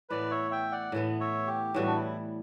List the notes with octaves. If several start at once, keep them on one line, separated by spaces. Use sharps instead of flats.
A2 E3 B3 B4 D5
C#5 E5
E5 G5
D5 F#5
A2 E3 B3
C#5 E5
G4
A2 E3 G3 F#4
D4
E4